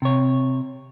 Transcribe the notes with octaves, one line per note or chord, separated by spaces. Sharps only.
C3 C#5